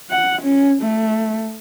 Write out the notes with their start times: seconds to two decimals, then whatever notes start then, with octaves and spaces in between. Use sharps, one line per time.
0.10 F#5
0.41 C#4
0.82 A3